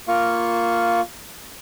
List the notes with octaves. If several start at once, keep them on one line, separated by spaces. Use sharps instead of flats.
A#3 F4 F5 C#6